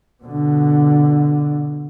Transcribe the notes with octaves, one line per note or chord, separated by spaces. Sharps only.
B2 D3